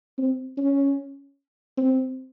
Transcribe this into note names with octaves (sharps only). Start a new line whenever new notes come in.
C4
C#4
C4